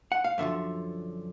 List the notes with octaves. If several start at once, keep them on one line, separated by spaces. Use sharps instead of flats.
F#5
F5
F#2 D3 F3 E5